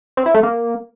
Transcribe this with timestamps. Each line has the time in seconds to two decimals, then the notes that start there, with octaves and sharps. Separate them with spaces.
0.17 C4
0.26 E4
0.35 A3
0.43 A#3